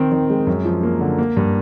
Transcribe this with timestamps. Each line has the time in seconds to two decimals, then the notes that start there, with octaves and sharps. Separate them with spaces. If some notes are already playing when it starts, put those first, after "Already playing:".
Already playing: D#3 C4
0.12 D#3
0.30 G#3
0.47 F#2
0.65 F3
0.83 A#3
1.01 D3
1.18 A#3
1.37 G2